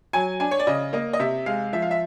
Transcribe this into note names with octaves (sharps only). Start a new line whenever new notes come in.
F#3 G#5
D4 G#5
C#5
D5
C#3 D#5
A#3 D#5
D#5
C3 E5
G#3 F5
F3 E5
F5
E5